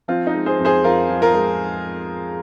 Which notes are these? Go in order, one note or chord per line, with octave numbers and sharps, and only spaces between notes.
F3 C4 F4
D#4
G#3
G#4 C5
F2
G#4 C5
F2 F4 A#4
F3
F4 A#4
G#3